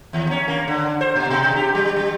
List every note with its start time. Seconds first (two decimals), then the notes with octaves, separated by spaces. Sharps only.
0.13 D#2
0.31 C#4
0.48 A#3
0.68 D3
1.01 C5
1.16 A#2
1.30 B2
1.56 G4
1.75 G3
1.96 G3